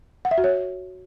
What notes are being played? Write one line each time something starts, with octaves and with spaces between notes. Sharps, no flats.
F#5
E5
F#4
C#5